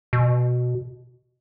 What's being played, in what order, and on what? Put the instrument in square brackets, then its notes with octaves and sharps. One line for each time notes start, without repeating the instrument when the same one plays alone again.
[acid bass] B2